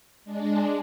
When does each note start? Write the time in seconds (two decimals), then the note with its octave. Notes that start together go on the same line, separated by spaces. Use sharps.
0.24 G#3 D4